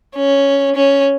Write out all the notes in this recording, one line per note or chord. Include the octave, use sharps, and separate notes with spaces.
C#4
C#4